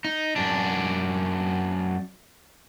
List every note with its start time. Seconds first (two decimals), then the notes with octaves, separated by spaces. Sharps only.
0.05 D#4
0.36 F#2 D4